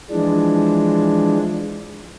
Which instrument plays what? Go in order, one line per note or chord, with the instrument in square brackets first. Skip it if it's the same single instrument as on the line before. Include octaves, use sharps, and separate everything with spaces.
[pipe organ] E3 F3 G#3 D4